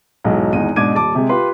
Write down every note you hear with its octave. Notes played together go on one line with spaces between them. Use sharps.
B1 E2 G#2 F#3
G#1 E2 G#2 D#5 D#7
G#2 B2 D4 D6 G#6 D#7
D#1 A5 D6
C3 G#3
F4 G4 B4 C6